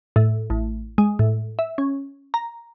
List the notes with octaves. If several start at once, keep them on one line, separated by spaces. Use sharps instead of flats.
A2
A1
G#3
A2
E5
C#4
A#5